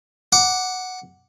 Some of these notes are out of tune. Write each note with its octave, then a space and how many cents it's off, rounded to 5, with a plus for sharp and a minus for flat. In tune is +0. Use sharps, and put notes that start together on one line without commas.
F#5 +0 D6 +0